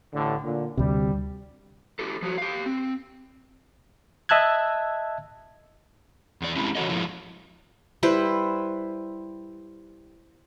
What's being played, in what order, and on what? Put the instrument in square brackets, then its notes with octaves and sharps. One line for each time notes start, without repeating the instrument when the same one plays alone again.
[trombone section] A1 A2 D3
A#2 D3
[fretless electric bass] D2 C3 [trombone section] G3
[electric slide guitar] E4 G4 A4
F3 F#3 F#4
G4 F5
C4
[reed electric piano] D#5 E5 A5 E6 F#6 G#6
[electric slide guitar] E2 D5
G#3 C4 C#4 E4 G4
C#3 E3 F#4 A4 C#5 D#5
G#2 C3 F3 E4
[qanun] G3 E4 B4 C5